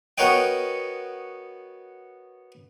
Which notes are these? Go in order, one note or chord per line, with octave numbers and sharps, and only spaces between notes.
B3 F#4 A#4 C#5 D#5 G5